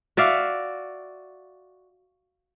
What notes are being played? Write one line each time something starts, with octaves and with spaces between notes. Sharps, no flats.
F#4 D5 E5 F5